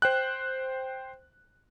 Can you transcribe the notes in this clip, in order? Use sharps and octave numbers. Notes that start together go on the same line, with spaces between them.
C5 G5 F#6